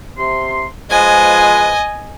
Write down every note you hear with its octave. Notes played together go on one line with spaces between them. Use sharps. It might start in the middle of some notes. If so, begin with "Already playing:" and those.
C3 C6
F3 G#3 B4 D#5 G#5